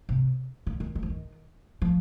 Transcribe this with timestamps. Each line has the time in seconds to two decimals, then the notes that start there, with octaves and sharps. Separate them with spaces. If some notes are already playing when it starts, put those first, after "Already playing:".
0.09 C3
0.67 D3
0.80 D#3
0.95 D#3
1.03 F3
1.10 D#3
1.82 F3